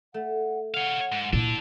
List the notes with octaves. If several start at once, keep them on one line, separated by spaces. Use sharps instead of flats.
A3 F#5
C#5 F5 F#5
G#2
A#2 D4 E4 A4